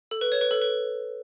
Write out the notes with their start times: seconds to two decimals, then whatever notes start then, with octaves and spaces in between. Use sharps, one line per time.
0.11 A4
0.21 B4
0.32 C#5
0.41 B4
0.51 A4
0.62 B4